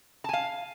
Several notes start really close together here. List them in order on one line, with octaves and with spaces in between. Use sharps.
A5 G#5 F5